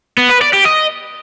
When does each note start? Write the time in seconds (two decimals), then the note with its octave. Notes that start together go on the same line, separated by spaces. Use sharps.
0.18 B3
0.29 B4
0.41 D5
0.53 G4
0.65 D#5